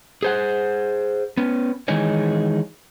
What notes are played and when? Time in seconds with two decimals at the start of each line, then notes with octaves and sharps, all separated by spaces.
0.23 G#4 C5 F#5
1.37 B3 C#4
1.88 D#3 E3 G#3 D#4 G#4 C#5